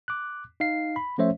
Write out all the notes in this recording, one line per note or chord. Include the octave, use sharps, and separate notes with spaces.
D6 F#6
D#4 F5 C7
B5
F3 A3 C#4 C5 C#5 E5